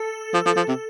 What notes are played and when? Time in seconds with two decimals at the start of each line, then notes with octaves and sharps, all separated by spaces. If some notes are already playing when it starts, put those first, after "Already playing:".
Already playing: A4
0.34 F3
0.46 F3
0.57 F3
0.68 C3